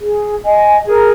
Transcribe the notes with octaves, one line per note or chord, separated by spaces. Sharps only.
G#4
D#5 G#5
G#4 A#4